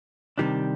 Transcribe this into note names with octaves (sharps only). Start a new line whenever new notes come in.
C3 D#3 G3 D4 G4